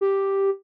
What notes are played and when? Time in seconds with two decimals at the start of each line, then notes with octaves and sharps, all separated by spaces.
0.01 G4